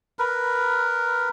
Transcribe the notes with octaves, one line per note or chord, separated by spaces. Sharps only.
A#4 B4